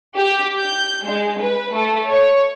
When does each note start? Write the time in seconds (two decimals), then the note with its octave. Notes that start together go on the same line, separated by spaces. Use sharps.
0.16 G4
0.60 G6
1.05 G#3
1.40 B4
1.73 A3
2.11 C#5